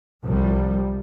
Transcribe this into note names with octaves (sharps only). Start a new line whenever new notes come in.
C2 F3 G3